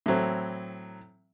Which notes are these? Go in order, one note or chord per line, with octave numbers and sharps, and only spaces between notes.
A2 E3 F#3 C4